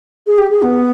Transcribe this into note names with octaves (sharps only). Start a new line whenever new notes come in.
G#4
G4
G#4
B3